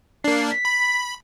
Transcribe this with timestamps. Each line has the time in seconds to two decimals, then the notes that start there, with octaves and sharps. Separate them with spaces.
0.24 A#3 D4 C7
0.51 B6
0.65 B5